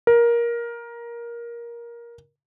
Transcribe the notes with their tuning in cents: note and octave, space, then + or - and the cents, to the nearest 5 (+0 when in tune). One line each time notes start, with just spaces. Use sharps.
A#4 +15